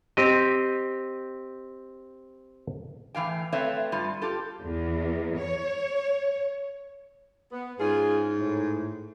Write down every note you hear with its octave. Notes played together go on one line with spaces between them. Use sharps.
C4 G4 D#5
A2 E3 F5 G5
A3 C4 B4 C#5 E5 F5
G2 G3 F4
F4 G4 A4
E2
C#5
B3
G#2 C#4 F4 G#4
A2